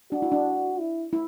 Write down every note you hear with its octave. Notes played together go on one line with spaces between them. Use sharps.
D4 F#4
E4
D4
E4
E4